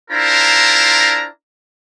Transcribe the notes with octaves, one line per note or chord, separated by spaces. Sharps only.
D4 E4 F4 A#4 C5 A#5